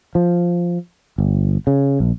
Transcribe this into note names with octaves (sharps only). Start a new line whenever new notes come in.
F3
G1
C#3
A#1